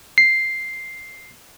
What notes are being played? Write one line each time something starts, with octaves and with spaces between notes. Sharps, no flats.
C7